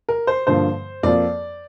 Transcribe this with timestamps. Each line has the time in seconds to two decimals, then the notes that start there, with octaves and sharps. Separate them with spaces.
0.09 A#4
0.27 C5
0.47 G2 D3 F3 A#3 C5
1.03 F2 F3 A#3 D5